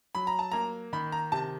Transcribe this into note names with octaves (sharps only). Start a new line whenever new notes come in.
F#3 B5
A#5
A5
A#3 A#5
D#3 B5
A#5
C3 A5